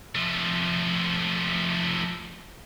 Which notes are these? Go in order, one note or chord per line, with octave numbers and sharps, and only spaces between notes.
F3 A3